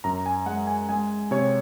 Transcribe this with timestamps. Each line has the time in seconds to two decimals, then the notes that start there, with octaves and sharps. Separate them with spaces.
0.04 F#2 A#5
0.26 G#5
0.46 G#3 F#5
0.67 G#5
0.89 G#3 G#5
1.31 C3 C#5